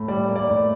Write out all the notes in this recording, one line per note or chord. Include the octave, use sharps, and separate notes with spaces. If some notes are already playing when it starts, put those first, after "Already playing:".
Already playing: A2
G3 D5
A#3
D5
A2